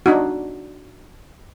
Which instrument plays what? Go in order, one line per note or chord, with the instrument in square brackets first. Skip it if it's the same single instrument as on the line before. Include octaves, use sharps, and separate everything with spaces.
[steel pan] D4 D#4 F#4